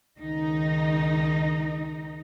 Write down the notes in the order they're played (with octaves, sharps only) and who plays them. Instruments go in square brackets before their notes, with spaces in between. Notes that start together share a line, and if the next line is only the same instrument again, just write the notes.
[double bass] C#2 D#3 [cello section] D#4